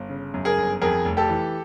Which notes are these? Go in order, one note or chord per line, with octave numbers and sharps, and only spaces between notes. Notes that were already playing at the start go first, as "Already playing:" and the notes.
Already playing: G1
C#3
F#2
G#4 A#4
G1
F2 G#4 A#4
F1
G4 A4
E3